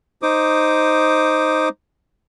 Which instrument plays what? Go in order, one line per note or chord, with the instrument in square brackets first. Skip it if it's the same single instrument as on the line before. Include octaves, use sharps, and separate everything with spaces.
[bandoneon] D#4 C5 D6 D#6